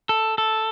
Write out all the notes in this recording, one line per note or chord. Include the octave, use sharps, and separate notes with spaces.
A4
A4